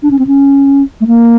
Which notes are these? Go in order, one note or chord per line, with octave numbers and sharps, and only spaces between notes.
D4
C#4
C4
C#4
A3
A#3